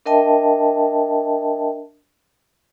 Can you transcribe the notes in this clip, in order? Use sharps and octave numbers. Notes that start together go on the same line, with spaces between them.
D4 A#4 D#5 E5 G5 A5